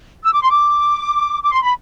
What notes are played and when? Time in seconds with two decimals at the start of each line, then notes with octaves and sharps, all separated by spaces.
0.24 E6
0.33 D6
0.42 C6
0.51 D6
1.43 D6
1.53 C6
1.62 B5